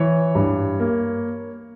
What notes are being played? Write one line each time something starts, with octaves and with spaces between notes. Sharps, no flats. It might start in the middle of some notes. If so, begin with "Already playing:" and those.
Already playing: E3 C#5
G2
A#3